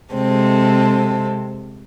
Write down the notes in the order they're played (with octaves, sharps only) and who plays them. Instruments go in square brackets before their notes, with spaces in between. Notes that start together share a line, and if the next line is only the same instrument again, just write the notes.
[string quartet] C3 G#3 C4 A4